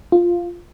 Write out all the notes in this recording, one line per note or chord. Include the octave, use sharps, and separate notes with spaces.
F4